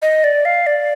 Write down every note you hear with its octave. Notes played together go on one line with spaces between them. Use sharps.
D#5
D5
F5
D5